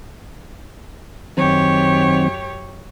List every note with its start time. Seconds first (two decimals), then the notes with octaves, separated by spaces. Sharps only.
1.37 F#2 D#3 F#3 C4 G4 C#5